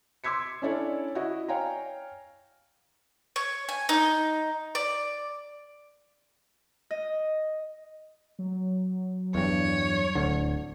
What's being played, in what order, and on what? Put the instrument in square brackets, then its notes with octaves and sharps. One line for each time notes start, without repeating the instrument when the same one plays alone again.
[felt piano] C6 D6 E6 G#6 B6 C#7
C#4 D4 E4 A4 C#5 D5
E4 F#4 D#5
C#5 F5 G5 G#5 A#5
[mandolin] C#5
G#5
D#4
D5
[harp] D#5
[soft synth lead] F#3
[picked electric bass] E2 G2 [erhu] C#5
[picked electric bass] D1 D2 D3